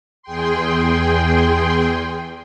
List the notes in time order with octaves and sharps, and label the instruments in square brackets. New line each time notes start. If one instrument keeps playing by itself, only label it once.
[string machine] E2 G#4 G5 C6